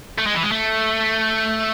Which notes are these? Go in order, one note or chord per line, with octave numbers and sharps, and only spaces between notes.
A3
G#3
E3
G#3
A3